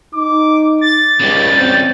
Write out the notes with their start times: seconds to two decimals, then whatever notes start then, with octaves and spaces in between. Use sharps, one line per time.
0.15 D#4 D6
0.81 D6 A6
1.20 C#2 C#3 G3
1.58 C4 G6